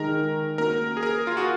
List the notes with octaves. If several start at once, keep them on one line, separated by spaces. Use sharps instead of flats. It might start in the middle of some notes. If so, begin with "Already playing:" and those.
Already playing: D#3 G#3 D#4 G#4 A#4
A#3 C#4 F#4 A#4
G#4
A#4
F4
F#4